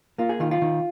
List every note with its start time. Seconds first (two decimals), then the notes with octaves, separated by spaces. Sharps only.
0.18 A#3 F4
0.29 G#4
0.40 D#3 F4
0.51 F4
0.62 D#3